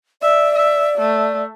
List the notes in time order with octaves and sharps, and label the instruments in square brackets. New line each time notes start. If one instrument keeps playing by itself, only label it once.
[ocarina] D5 [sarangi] E5
[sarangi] E5
A3